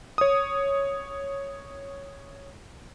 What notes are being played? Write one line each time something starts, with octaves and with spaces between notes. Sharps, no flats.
C#5 D#6